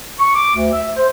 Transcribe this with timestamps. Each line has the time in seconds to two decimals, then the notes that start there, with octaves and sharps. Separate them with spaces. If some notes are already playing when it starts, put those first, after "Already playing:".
0.20 C#6
0.35 D6
0.55 D2
0.72 E5
0.96 C5